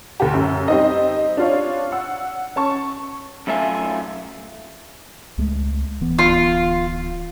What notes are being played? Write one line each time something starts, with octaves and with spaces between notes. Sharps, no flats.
D2 G4
F#2
G3 C4 D#4 D#5
D4 F4 C#5
F#5 E6
C#4 A5 C#6
F#2 A3 F4 E5 G#5
C#2 G#3 A3
D1 E3 B3
F4